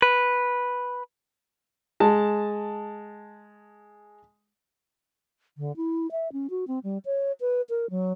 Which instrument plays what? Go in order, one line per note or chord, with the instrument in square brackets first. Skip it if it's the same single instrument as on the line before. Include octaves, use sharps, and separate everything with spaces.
[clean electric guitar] B4
[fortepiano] G#3 A5
[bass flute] D3
E4
E5
C#4
F#4
C4
G3
C#5
B4
A#4
F#3